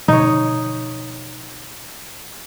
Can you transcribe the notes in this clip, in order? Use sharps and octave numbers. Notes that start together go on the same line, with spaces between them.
B2 D3 F3 D#4 C#5